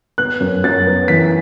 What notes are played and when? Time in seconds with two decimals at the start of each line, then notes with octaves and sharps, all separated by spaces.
0.18 B3 F#6
0.40 F#2
0.64 F#2 A6
0.87 B3
1.08 E3 B6